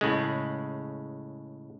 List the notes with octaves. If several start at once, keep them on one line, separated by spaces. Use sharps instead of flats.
A2 C#3 G#3